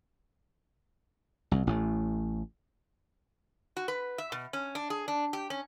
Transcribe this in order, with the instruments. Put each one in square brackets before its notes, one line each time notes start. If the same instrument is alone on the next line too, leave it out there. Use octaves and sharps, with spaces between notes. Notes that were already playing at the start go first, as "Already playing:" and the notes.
[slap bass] C2
A1 A2
[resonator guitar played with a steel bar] F#4
B4
E5
B2
C#4
D4
G#4
D4
G4
C#4